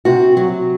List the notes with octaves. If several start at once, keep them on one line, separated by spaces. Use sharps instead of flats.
C3 F#4
F#3